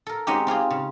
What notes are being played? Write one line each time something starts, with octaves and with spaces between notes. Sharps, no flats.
A4 A#4
G#3 C4 C#4 D#4 F#4 G4
C4 F4 G4 G#4
C#3